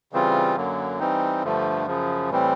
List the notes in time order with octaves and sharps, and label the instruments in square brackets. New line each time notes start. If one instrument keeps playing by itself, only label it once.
[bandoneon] C#3 E3 G3 C4 F4
F#2 D3 F#3 A#3
E3 G3 C4 D#4
G2 D3 F3 A3
F#2 C#3 F3
A2 E3 G3 C4